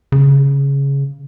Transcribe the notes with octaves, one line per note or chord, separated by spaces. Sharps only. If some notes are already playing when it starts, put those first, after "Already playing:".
C#3